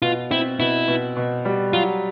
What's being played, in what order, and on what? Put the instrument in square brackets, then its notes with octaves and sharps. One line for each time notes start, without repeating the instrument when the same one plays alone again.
[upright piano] B2 [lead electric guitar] F4
[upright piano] C4 [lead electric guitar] E4
[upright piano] B2 [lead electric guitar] E4
[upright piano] B2
B2
G3
[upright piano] F#3 [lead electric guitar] F4